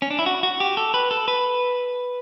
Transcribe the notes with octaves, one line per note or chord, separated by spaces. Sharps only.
C#4
D4
E4
F#4
F#4
G4
A4
B4
A4
B4